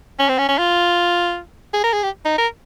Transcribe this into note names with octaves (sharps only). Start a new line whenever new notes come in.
C#4
C4
C#4
C#4
F4
G#4
A#4
G#4
G4
D#4
A#4